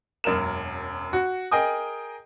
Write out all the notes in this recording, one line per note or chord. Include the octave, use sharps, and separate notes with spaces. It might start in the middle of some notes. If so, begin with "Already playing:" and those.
E1 F#2 A#3 A#4 E7
F#4
G#4 A#4 D#5 G5 G#5 D#6